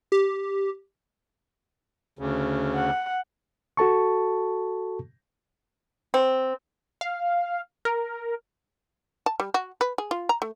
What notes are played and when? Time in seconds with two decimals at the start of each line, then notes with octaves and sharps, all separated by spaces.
0.12 G4
2.19 D2 C#3
2.75 F#5
3.77 F#4 A4 A5 C#6
6.14 C4
7.01 F5
7.85 A#4
9.26 A5
9.40 G3
9.54 F#4
9.81 B4
9.98 G#4
10.11 F4
10.29 A#5
10.42 A3